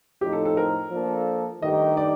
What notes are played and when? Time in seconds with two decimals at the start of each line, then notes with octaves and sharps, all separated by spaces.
0.21 A2 F3 C4 D#4 G4
0.33 A4
0.45 A4
0.57 A#4
0.91 F3 A#3 D4 A4
1.62 G2 D#3 A3 D#4 G4 D#5
1.97 D5